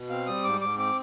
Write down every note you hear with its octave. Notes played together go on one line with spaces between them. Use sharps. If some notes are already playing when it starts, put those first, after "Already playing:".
Already playing: B2
C4 F5
G3 D#6
G#2 D6
G#2 D6
C4 D6